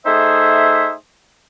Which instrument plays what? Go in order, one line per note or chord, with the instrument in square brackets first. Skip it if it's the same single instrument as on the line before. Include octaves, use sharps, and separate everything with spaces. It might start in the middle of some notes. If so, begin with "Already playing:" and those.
[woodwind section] A3 D#4 G#4 C5 E5